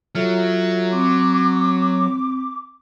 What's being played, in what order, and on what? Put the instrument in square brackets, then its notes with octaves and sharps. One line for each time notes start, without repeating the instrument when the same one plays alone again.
[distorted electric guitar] F#3 [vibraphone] F4 A4 E5
[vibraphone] C4 [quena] D6